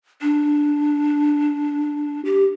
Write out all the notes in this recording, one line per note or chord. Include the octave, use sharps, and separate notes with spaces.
D4
G4